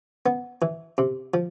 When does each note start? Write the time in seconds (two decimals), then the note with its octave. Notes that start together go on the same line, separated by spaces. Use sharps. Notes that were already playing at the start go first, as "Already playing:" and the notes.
0.26 B3
0.62 E3
0.98 C3
1.34 F3